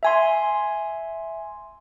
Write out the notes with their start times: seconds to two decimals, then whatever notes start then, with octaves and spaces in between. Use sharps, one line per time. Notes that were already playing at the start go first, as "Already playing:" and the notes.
0.03 E5 G#5 C6